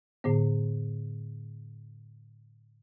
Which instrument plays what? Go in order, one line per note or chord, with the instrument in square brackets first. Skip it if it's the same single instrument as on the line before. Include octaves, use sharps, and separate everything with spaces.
[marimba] A2 D3 B3